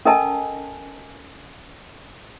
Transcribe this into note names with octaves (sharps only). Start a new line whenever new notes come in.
C#4 A4 A#4 D#5 G#5 A5